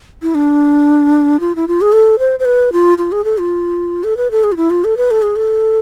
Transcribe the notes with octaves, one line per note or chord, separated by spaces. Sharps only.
E4
D4
F4
E4
F4
G#4
A4
C5
C5
B4
F4
F4
G#4
A4
F4
A4
B4
A4
G#4
F4
E4
F4
A4
B4
A4
G#4
A4